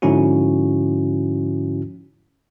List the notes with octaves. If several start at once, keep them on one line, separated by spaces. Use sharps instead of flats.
G#2 D3 F3 C#4 E4 F#4